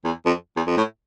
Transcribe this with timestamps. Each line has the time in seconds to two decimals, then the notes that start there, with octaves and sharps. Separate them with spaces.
0.04 E2
0.25 F2
0.56 E2
0.67 F2
0.77 A2